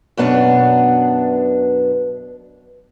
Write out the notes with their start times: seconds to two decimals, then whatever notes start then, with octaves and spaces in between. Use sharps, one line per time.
0.17 F#2 B2 B3 D4